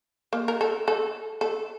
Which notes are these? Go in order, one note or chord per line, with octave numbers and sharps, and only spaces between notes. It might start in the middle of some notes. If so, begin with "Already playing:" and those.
A#3
A#4
A4
A4
A4